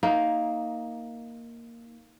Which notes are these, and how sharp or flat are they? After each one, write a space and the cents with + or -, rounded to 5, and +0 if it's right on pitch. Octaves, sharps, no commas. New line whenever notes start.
A#3 +0 D#4 +15